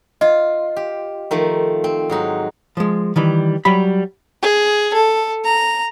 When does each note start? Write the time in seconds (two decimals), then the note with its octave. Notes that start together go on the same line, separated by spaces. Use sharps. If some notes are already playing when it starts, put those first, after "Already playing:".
0.21 F4 D#5
0.76 G4
1.31 D#3 F3 A3
1.84 C4
2.09 G#2 F#3 D#4
2.77 F3 G#3
3.16 D#3 E3 G3
3.65 F#3 G3 B5
4.42 G#4
4.94 A4
5.45 A#5